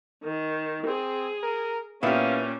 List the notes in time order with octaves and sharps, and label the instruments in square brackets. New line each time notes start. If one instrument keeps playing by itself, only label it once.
[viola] D#3
[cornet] C4 [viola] G#4
[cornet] A#4
[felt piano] A#2 G4 [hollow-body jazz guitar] B3 E4 [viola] C#4 [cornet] F5